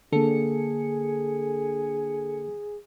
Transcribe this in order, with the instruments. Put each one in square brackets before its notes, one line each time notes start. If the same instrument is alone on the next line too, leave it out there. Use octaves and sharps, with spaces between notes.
[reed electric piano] D3 A#3 [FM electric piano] D4 A4 C#7 [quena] G#4